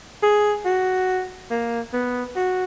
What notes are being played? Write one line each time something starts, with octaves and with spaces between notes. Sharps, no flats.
G#4
F#4
A#3
B3
F#4